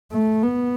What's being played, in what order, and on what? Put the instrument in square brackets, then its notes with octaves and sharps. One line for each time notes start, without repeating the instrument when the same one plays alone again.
[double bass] A3
B3